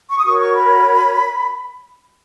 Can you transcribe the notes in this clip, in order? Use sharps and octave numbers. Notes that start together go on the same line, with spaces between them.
C#6
D#6
F#4 A#4 C#5 C#6
C#6
B5